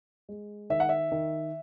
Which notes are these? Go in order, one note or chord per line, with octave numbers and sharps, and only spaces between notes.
G#3
D#3 E5
F#5
E5
D#3